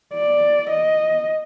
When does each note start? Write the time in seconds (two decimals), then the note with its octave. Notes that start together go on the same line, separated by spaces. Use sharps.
0.14 D5
0.70 D#5